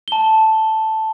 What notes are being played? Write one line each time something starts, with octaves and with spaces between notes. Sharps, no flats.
A5 G7